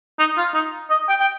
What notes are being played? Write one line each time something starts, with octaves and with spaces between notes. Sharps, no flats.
D#4
F4
D#4
D#5
G5
G5